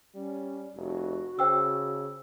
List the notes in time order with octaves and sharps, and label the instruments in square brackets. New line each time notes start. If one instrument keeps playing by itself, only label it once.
[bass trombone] G3 [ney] C#4
[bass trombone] F1 [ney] F#4
[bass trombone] C#3 [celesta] C5 G5 E6